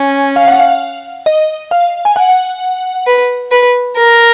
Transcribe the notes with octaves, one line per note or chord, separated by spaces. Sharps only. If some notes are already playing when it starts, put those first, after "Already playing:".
Already playing: C#4
F5
F#5
F5
D#5
F5
G#5
F#5
B4
B4
A#4